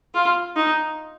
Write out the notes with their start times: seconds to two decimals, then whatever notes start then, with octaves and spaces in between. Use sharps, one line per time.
0.14 F4
0.56 D#4